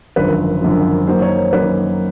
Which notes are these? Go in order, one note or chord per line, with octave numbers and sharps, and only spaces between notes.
G#1 F#2 D3 F3 B4
G#1 F#2 D3 F3
F#2 D#3 F#3 A#3 C5
C#5
C5
F#2 D#3 F#3 A#3 B4